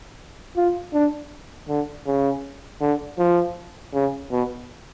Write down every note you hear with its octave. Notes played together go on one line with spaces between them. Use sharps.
F4
D4
D3
C#3
D3
F3
C#3
B2